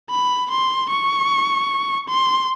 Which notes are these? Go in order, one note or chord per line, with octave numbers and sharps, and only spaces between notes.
B5
C6
C#6
C6